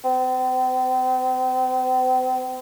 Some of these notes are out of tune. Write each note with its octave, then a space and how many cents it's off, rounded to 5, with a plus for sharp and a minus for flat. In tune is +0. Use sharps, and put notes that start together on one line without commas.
C4 -40